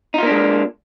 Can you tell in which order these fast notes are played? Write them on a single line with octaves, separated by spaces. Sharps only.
D#4 F4 A#3 D4 G#3